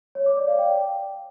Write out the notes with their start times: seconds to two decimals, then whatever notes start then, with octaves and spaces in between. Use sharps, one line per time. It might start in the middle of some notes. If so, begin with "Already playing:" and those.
0.15 C#5
0.26 D6
0.37 D5
0.48 F5
0.58 G5